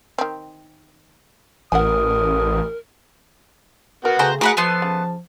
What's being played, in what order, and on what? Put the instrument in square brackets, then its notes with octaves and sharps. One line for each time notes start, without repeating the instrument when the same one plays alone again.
[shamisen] D#3 C4
[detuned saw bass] A1 [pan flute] A#4 [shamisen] F#5 G#5 [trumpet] D#6
[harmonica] B3 F#4 F#5 [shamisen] A#4
[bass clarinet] C#3 [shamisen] A3 G5 G#5 [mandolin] C5 A#5
[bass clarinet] A3 [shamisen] F#4 [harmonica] G#4 [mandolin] A#4 B4 F#5
[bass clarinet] F3 [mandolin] A3 B3 C6 [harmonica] A5
[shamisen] C#3